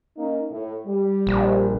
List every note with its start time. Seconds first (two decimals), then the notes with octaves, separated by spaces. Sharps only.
0.16 A#3 C#4 D#4
0.51 A2
0.86 G3
1.27 A#1